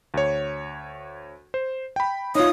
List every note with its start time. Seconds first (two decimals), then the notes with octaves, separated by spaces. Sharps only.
0.14 D2 C#5
1.54 C5
1.96 G5 B5
2.35 D#4 F4 C#5 D#6